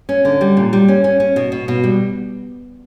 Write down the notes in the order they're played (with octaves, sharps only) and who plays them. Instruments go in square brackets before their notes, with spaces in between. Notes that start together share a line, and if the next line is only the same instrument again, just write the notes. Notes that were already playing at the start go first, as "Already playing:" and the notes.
[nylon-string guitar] C#4
D3
G3
A#2
G3
C#4
C#4
C#4
B2
B2
B2
G3